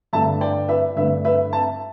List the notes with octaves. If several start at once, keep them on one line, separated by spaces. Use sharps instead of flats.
G2 D3 A3 E5 A5
D5 G5
B4 E5
G2 D3 A3 B4 E5
B4 E5
E5 A5